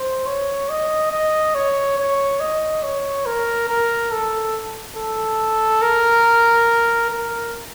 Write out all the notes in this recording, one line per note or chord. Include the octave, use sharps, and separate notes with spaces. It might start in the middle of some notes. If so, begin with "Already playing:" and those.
Already playing: C5
C#5
D#5
D#5
C#5
C#5
D#5
C#5
A#4
A#4
A4
A4
A#4
A#4